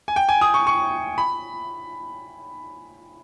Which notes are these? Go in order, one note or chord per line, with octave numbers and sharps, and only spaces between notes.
G#5
G5
G#5
D#6
C#6
C#6
B5